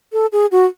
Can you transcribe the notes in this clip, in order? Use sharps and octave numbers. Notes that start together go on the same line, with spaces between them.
A4
G#4
F#4